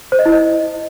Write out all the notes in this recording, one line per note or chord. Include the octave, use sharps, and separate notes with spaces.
C5
D#5
E4
D#5